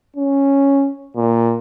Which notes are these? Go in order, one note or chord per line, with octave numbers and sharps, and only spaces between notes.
C#4
A#2